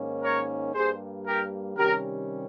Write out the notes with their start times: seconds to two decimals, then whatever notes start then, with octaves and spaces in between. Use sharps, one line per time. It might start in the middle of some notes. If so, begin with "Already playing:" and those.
Already playing: G#2 D#3 A#3 C#4
0.22 A#4 C#5
0.73 G2 G3 A#3 G#4 C5
1.24 G4 A#4
1.75 C3 D#3 G3 C#4 G4 A#4